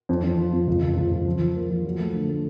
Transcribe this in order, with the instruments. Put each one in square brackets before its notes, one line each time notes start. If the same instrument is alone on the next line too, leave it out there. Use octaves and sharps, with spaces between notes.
[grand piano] F2
F2
F3
F2
C#2
C#2
C#2
C#2
F3
F3
A#3
F3
F#3
A3
D3
A3